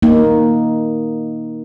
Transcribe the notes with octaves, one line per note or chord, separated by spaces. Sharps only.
A#3 D#4